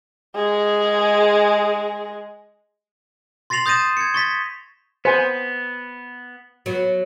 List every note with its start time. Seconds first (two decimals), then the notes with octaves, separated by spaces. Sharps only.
0.35 G#3 G#4
3.50 C6 A6 A#6 C7 F7 F#7
3.66 D#6 G6 A6 A#6 D#7 E7
3.97 G#6 C#7
4.14 C#6 A6 B6
5.05 B3 C5 G#5
6.66 F#3 B3